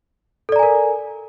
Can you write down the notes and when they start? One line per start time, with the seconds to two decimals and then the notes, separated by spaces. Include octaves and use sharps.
0.49 A4
0.52 D5
0.56 A#5
0.59 G#5
0.63 A#4